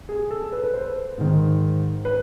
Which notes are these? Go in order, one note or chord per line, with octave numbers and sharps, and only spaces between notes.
G#4
A4
B4
B4
C5
G#2 D#3
B4